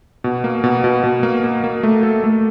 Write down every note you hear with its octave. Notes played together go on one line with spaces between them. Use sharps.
B2
A#3
B2
B2
B2
A#3
A#3
A#3
A3
A4
A3